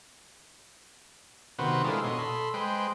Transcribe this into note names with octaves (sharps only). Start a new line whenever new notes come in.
C3 D#3 B3 F#4 B4 C5
G#3 D4 E4 F4 A4 A#4
B2 C#5 D#5 C6
A4 B5 C6
G#3 B4 C5 G5